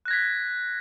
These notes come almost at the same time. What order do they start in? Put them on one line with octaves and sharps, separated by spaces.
F#6 A#6 G#6 B6